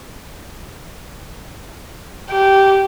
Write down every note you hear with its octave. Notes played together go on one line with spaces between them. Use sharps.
G4